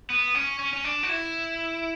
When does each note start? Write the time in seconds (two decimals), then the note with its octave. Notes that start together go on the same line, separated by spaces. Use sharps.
0.10 B3
0.35 C#4
0.59 C#4
0.73 C#4
0.84 D4
1.03 F#4
1.09 E4